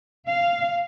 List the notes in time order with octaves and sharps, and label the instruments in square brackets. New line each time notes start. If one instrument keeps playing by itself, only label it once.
[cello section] F5